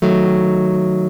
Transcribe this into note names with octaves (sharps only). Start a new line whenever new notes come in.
D#3 F#3 A3